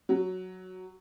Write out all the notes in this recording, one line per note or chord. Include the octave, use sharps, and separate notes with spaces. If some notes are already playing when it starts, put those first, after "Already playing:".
F#3